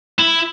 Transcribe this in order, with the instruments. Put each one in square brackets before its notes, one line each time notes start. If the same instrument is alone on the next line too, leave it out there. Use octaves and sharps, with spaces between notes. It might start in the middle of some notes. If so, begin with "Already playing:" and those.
[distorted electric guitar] E4